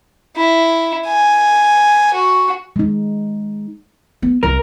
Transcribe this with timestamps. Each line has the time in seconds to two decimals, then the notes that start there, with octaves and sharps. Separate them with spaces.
0.36 E4
1.07 G#5
2.14 F#4
2.76 G#3 D#4
4.22 B3
4.43 C2 E4 A#4